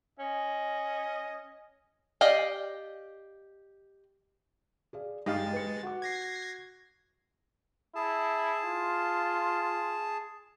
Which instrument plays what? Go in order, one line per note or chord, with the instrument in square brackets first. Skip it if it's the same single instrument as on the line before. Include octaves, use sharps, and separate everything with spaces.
[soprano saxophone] C#4 [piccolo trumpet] D#5
[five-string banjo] G4 D5 D#5 F5
[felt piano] G#4 D5 F5
[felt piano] G2 D#6 [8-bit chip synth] G#3 A6 [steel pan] D#4 G4 F5
[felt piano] B4 C#7
F#4 F#5 D6
[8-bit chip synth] G#6 A#6 C7
[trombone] E4 [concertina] G#4 A5
[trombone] F4